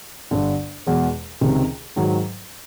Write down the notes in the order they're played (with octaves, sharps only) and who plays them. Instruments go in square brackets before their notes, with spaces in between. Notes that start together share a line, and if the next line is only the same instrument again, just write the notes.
[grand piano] G1 G2 D3
E2 B2 G#3
C#2 C3 D#3
G#2 D#3 F#3